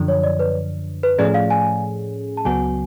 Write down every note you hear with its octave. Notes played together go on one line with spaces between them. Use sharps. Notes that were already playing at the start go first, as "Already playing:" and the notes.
Already playing: F#2 D3 F3
C#5
D5
B4
B4
A2 F3 A3 C#4 G#4 D5
F5
G#5
A5
C#2 C#3 F#3 B3 F#4 G#5